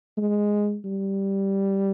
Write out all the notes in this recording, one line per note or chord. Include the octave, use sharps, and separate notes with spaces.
G#3
G3